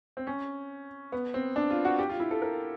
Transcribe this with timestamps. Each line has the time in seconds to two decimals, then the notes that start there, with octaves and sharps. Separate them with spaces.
0.17 C4
0.27 C#4
1.12 B3
1.34 C4
1.56 D4
1.70 F4
1.85 F#4
1.99 G4
2.09 F4
2.20 E4
2.31 A4
2.42 A#4